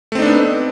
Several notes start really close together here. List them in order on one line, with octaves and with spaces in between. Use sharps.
A3 C4 D#4 D4 B3